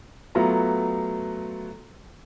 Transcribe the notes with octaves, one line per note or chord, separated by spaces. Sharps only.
F#3 A3 B3 F4 A#5